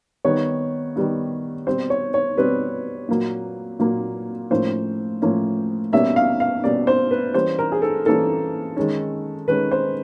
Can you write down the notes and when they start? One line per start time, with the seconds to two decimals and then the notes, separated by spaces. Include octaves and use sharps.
0.25 D#3 G3 B3 C#5
0.96 D#3 G3 B3
1.67 B2 G3 C4 C5
1.90 C#5
2.14 C#5
2.38 B2 G3 C4 B4
3.08 A#2 F#3 A#3
3.79 A#2 F#3 A#3
4.50 A2 F3 A#3 C#4 C5
5.22 A2 F3 A#3 C#4
5.93 B2 G3 A#3 C#4 E5
6.16 F5
6.40 F5
6.64 B2 G3 A#3 C#4 D5
6.87 C5
7.11 B4
7.34 E3 G3 A#3 C#4 C5
7.59 A#4
7.72 G#4
7.82 A4
8.06 E3 G3 A#3 C#4 A4
8.77 D#3 G#3 C#4
9.48 D#3 G#3 C#4 B4
9.71 C5